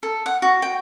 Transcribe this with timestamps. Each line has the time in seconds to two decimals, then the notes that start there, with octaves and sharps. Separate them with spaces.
0.03 A4
0.26 F#5
0.42 F#4
0.62 G5